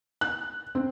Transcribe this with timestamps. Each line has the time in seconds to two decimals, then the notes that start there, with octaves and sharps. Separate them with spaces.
0.21 F#6
0.75 C4